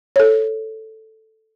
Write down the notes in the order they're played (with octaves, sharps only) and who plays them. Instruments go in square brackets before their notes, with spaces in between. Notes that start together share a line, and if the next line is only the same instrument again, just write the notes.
[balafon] A4 C#5